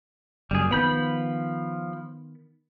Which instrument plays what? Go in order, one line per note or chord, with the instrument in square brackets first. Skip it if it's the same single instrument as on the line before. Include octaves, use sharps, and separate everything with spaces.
[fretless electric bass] F#1 F#2 [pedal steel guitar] G3 G#4
[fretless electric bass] D#3 B3 [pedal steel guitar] F3 B5 G6